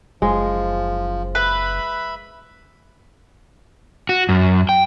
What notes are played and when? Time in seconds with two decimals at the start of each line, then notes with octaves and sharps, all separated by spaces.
0.22 F#1 F3 G#3
1.35 B4 E5 B5
4.09 F#4
4.29 F#2
4.69 G5